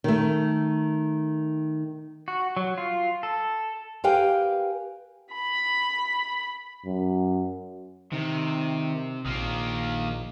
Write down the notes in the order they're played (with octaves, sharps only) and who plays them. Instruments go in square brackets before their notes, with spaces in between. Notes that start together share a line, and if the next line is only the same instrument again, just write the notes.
[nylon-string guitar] D#3 A3
[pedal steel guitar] F#4
F#3
F4
A4
[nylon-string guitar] G4 A#4 B4 F5 G5 G#5
[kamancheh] B5
[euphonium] F#2
[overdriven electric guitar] C3 [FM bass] D#3
[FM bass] A#1 [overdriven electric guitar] D#3 A#3